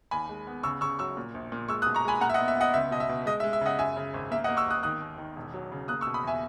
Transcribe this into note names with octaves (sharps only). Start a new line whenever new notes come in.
D#2 G#5 B5
G#3
B3
C#3 C#6 E6
C#3 C#6 E6
F#3 C#6 E6
A#2
A#1
A#2
G#3 C#6 E6
D#6 F#6
B2
A#5 C#6
G#3 G#5 B5
A#2 F#5 A#5
E5
D#5 F#5
B3
E5
B3 D#5 F#5
C#2 E5
B2 D#5
E5
B2
G#3 D#5
E5
G#3
E5
C#3 D#5 F#5
F#2 E5 G#5
C#3
G#1
A#3 E5
D#5 F#5
A#3
C#6 E6
G#1 D#6 F#6
D#3 D#6 F#6
D#2
D#3
E1
F#3
C#3
A#3 D#6 F#6
C#6 E6
B2
B5 D#6
E2 E5 G#5